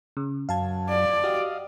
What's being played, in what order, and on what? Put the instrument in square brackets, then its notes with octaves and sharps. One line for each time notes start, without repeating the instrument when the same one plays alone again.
[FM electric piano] C#3
[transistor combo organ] F#2 [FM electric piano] F5 A5 G#6
[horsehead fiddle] D5
[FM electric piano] F#4 G4 [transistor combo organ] D#5 F5